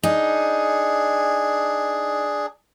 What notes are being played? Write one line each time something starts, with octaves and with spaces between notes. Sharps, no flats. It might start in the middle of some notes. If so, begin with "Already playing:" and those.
D4 D#4 G#4